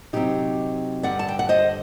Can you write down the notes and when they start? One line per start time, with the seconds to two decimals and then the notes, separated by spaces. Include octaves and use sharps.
0.13 C3 F#3 C4 D#4 G4
1.03 G2 D3 G3 D5 F#5
1.19 A5
1.28 G5
1.39 F#5
1.49 C5 D#5